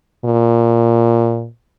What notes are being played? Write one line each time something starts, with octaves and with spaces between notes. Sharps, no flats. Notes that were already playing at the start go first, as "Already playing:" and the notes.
A#2